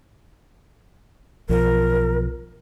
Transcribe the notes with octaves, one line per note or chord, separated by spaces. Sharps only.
B1 F3 A#4